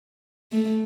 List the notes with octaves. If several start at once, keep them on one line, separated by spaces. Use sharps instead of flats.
A3